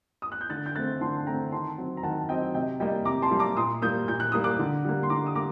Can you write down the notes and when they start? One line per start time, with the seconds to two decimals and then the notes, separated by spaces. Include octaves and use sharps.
0.22 D#6
0.32 F#6
0.41 G6
0.50 D3 F#6 A6
0.66 G6
0.75 A3 F#6 A6
0.79 C4
1.01 D3 A5 C6
1.27 A3 C4 G5 A#5
1.52 D#3 A5 C6
1.78 F#3 C4
1.97 A#5
2.03 D#3 F#5 A5
2.29 F#3 C4 D#5 G5
2.54 C3 D#5 G5
2.80 G3 A#3 D#5 G5
3.05 C3 A#5 D6
3.22 A5 C6
3.31 G3 A#3
3.39 A#5 D6
3.57 A#2 C6 D#6
3.82 G3 A#3 D#6 G6
4.08 A#2 G6
4.20 F#6
4.32 G3 A#3 D#6
4.44 D6 F#6
4.59 D3
4.85 G3 A#3
5.03 C6
5.10 D3 A#5 D6
5.26 D#6
5.35 G3 A#3 A#5 D6